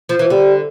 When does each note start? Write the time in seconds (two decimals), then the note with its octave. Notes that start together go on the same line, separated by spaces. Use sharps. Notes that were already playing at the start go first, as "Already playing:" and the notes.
0.09 F3
0.19 E3
0.25 F3
0.30 D3 G3